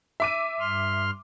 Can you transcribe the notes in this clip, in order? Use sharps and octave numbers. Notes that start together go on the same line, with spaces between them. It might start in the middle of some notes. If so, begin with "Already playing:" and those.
E5 D6 D#7
G2 C6 F6